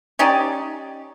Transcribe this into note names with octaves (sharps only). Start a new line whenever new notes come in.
C#4 D#4 G4 D5